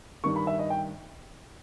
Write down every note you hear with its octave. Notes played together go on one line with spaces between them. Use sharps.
G2 D#3 C#6
B5
E5
D#5
G5